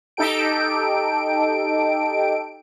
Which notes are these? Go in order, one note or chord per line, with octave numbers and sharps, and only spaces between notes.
D#4 G4 A4 G5 D7